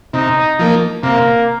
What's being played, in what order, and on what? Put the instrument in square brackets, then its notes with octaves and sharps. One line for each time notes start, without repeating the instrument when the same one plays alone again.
[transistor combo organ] C3 [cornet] D#4
[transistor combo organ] F3 A#3
[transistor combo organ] C3 [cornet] A#3